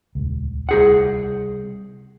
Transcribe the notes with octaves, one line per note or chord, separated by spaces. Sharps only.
D#1 C#2
C2 G#4 F#5